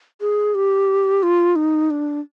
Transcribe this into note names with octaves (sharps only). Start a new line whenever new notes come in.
G#4
G4
F4
D#4
D4